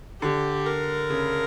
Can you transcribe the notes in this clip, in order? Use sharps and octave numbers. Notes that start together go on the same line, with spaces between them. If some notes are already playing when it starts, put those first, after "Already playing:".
D3 G4
A#4
C#3